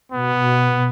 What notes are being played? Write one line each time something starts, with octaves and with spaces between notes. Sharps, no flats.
B2 B3